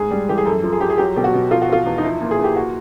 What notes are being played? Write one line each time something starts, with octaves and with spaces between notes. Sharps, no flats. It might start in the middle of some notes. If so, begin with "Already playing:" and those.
Already playing: G#2 G#4
G3
E3 G4
G#4
F#2 A4
F3
G#4
F3 G4
G#4
F#3 G4
B2 G4
F#4
B2
F3 F4
F#4
F3 F4
E2
D#4
F3 E4
A#2
G#4
A#2
G4
F#4